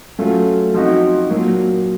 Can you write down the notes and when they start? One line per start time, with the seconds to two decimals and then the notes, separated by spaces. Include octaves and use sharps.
0.18 F#3 A3 C#4 F4
0.74 F3 C4 D#4 F#4
1.30 A#2 F#3 A#3